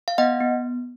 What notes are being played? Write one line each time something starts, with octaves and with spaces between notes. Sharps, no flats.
F5
B3 D#5 F#5
B3